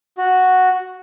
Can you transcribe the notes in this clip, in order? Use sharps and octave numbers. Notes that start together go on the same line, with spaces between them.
F#4